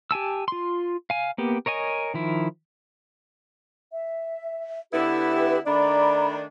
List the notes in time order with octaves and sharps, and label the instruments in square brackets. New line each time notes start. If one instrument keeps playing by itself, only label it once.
[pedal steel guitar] G4 G#5 A5 E6
F4 C6
F5 G#5
A#3 B3 G4
A#4 C#5 D#5 G#5
D#3 F3 E4
[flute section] E5
[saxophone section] D3 B3 E4 [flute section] G4 B4
[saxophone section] D#3 A3 D4 [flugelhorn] D5 [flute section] A#5 B5